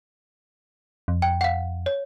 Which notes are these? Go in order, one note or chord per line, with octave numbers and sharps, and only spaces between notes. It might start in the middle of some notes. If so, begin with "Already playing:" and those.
F2
G5
F5 F#5
C#5